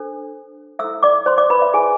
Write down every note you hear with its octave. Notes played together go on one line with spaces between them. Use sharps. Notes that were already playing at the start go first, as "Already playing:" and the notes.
Already playing: D4 A4 C5
E4 A4 C5 E5 E6
D5 D6
C5 C6
D5 D6
B4 B5
E5
E4 G#4 B4 G#5